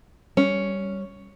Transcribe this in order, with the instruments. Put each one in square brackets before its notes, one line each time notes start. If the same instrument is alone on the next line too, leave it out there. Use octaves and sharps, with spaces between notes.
[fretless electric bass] G3 [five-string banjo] C#4